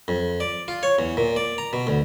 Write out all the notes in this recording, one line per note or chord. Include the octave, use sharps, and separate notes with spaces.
F2
D5
F4
C#5
E2
A#2
D5
A#5
B2
D2